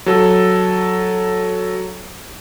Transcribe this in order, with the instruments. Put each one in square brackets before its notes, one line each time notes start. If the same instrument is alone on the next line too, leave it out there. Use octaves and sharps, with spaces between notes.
[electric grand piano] F#3 A4